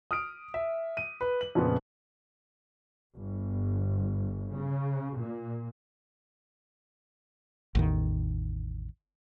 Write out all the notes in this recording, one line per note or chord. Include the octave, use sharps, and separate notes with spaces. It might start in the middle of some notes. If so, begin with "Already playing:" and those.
D#6 F6 D7
E5
D#7
B4
F#7
F2 A#2 C#3 B3
G1
C#3
A#2
A1 E2 D#3